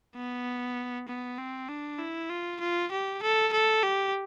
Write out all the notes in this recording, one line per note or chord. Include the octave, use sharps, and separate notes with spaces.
B3
B3
C4
D4
E4
F4
F4
G4
A4
A4
G4